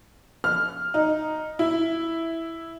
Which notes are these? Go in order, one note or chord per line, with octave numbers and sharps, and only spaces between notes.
F6
D#4
E4